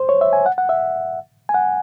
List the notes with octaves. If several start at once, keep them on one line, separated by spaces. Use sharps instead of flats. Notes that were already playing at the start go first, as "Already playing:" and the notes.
Already playing: C5
C#5
E5
G#5
F#5
F#5
E5
G#5
F#5